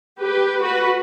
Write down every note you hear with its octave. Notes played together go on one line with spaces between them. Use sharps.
G4 B4
F#4 B4